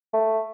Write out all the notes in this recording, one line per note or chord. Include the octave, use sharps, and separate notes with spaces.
A3